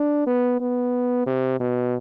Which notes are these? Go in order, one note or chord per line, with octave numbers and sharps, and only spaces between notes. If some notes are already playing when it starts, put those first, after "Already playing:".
Already playing: D4
B3
B3
C3
B2